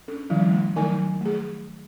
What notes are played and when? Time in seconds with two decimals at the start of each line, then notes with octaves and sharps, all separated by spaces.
0.08 C#4 D4 A4
0.30 D#3 F3 G3 E4
0.50 A3
0.76 D#3 F#3 A3 D#4 A#4 G#5
1.21 A3 G#4